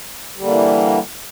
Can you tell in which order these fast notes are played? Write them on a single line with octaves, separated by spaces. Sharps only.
G3 D3 A#3 E3